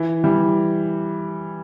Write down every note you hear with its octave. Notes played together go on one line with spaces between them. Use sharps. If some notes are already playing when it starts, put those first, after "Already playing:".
Already playing: E3
E3 G3